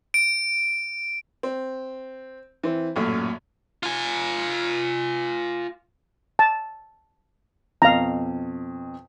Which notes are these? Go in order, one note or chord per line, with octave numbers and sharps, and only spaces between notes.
D7
C4
E3 C4
A1 F#2 A#2
F4 G#5
A5
F2 B2 F5 A#5